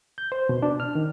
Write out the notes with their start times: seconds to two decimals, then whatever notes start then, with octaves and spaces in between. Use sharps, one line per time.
0.18 G6
0.32 C5
0.49 B2
0.62 D4
0.80 F6
0.95 D#3